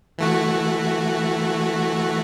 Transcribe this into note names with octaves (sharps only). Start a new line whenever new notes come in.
E3 A3 F#4